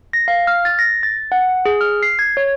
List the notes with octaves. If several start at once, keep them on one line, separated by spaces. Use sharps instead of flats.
A#6
F5
F6
A6
A#6
A6
F#5
G#4
F6
C7
G#6
C#5